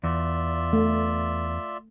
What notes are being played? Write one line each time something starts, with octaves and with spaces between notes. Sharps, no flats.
E2 F4 D5 E5
A3